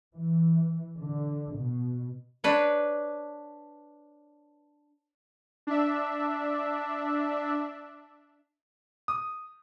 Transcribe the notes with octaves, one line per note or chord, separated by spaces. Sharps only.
E3
D3
B2
D4 B4 C#5
D4 E5
D#6